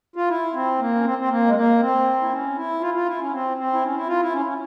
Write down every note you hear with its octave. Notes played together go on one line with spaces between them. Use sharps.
F4
E4
C4
A#3
C#4
C4
C4
A#3
G#3
A#3
C4
E4
C#4
E4
F4
F4
E4
C#4
C4
C4
E4
C#4
E4
F4
E4
C#4
C#4